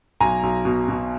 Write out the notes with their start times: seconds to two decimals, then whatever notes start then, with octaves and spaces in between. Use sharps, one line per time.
0.20 B1 G#5 A#5
0.43 B1
0.65 B2
0.88 B2